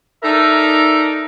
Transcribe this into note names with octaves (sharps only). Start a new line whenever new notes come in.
D#4 A4 A#4 D5 E5